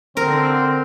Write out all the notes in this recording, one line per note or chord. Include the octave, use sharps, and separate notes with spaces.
D3 C4 A#4